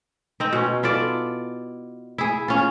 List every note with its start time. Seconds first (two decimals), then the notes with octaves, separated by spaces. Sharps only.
0.40 C4 D#4
0.53 B2 C#4
0.83 E4 F4 A4 D5
2.18 E4 G#4
2.48 C#4 F4